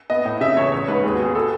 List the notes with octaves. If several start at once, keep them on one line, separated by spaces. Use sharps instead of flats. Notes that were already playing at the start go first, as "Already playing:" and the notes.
B3 D#5
A2
C#3 E5
E2 C#5
A1 C#5
G#2 B4
D#2 G#4
F#4
B3
G#4
B2 A4